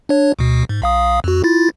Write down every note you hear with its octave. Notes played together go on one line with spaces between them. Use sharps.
D4 C#5
D2 B2
G#2
B1 F5 D#6
F2 F#4
E4 F4 A6